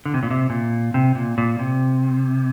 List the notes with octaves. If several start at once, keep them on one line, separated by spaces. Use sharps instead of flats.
D3
C3
A#2
C3
A#2
C3
A#2
A#2
C3